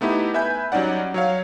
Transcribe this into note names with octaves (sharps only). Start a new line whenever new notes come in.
A3 B3 D#4 E4 G4
B4 E5 G#5 B5 G6
F#3 G3 C#4 D#4 D5 F#5
F#3 C#5 F5